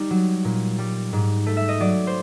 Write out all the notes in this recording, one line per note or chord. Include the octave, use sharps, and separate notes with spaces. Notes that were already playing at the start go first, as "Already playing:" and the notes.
Already playing: G3 D#4
F#3
A#2
G3
G#2
A3
E5
D#5
F#3 D5
C5